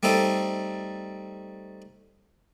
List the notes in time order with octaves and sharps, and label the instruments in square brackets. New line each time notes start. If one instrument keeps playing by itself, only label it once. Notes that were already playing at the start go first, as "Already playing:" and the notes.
[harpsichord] G3 A3 C4 D#4 A4